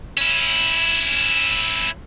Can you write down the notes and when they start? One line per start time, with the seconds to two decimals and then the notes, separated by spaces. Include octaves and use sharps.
0.18 C#4 E4